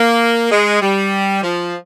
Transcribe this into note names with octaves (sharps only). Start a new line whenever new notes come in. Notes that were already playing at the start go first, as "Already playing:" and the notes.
Already playing: A#3
G#3
G3
F3